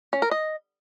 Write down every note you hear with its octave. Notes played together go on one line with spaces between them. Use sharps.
C#4
A#4
D#5